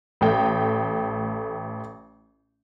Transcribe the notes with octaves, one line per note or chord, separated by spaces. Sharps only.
A1 A3 G5